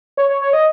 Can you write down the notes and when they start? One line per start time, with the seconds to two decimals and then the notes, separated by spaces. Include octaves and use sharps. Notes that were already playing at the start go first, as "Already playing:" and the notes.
0.17 C#5
0.29 C#5
0.41 C#5
0.53 D#5